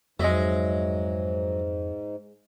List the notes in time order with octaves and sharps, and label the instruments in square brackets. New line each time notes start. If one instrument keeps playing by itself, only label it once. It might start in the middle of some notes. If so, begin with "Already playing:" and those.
[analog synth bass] F2 [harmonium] G#2 [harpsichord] F#3 [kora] G#3 D#5 E5